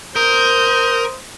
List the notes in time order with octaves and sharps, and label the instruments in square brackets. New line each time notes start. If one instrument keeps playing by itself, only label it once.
[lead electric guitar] A#4 [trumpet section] C5 D#6 [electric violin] G6